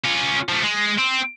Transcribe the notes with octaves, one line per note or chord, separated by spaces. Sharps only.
C#4 F4
F3 A3
G#3
C4